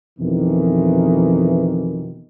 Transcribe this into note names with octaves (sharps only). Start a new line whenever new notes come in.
F2 B2 D#3 E3